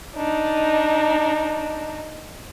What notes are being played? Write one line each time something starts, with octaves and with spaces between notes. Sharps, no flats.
D4 D#4